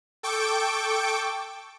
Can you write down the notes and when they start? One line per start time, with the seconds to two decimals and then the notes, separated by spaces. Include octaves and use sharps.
0.23 A4 G5 C#6 D6 D7